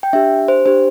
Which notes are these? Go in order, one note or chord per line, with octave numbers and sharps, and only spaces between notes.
G5
D4 G4 E5
C5
D4 G4 C5